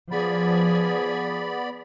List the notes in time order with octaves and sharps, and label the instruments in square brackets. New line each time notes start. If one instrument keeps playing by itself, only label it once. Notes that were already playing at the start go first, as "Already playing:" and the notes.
[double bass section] F3 [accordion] B3 D5 B5 [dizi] G#4